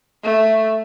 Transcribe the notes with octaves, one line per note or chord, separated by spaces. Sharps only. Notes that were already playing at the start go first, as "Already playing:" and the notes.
A3